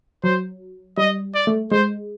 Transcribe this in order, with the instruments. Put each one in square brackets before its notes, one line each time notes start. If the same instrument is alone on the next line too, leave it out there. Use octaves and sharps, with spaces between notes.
[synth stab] F#3 [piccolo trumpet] C5
[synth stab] G3 [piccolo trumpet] D#5
[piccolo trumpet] D5
[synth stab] A3
[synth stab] G#3 [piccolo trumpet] C5